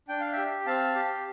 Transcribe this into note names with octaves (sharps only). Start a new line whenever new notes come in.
D4 G5
F5
G4 E5 G5
C4 F5 A5
G4